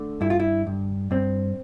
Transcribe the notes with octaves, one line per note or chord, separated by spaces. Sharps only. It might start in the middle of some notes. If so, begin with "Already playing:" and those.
Already playing: D3 A3
G2 E4
F4
E4
G2
G2 C4